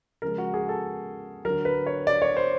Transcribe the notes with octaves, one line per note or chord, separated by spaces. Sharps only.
C#3 F3 G#3 A#4
F#4
G#4
A4
D3 F#3 A#4
B4
C#5
D5
C#5
C5